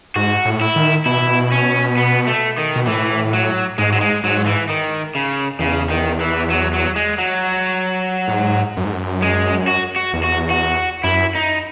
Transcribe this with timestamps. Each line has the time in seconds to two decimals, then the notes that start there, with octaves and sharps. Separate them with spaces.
0.16 G#2 F#4
0.45 A2
0.61 E4
0.76 D#3
1.06 B2 E4
1.52 C#4
1.97 B3
2.27 A3
2.58 D#3
2.76 B2
2.87 A2 E3
3.33 F#3
3.78 G#2 G#3
3.92 F#3
4.01 G#3
4.23 G#2 F#3
4.46 E3
4.69 D#3
5.15 C#3
5.59 E2 C#3
5.90 D#3
6.21 E3
6.50 F#3
6.73 F#3
6.96 G#3
7.18 F#3
8.28 A2
8.32 G#2
8.77 F#2
8.85 G#2
8.93 F#2
9.22 G#3
9.68 F#4
9.96 F#4
10.13 E2
10.24 F#4
10.50 F#4
11.04 F#2 E4
11.35 D#4